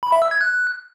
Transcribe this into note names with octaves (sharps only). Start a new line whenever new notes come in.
B5
E5
E6
G#6
F#6